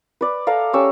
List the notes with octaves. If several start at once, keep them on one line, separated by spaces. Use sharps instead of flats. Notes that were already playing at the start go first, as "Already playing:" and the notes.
B4 D5
A4 D5 F5 A#5
C#4 G4 C#6 E6